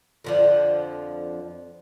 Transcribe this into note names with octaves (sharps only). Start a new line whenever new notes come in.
F2 D3 F3